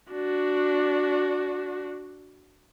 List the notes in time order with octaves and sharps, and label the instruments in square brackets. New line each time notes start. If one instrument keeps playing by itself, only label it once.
[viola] D4 F#4